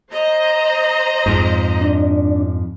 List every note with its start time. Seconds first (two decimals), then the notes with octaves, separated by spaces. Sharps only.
0.12 C5 D#5 A#5
1.26 F2 G#2
1.81 D4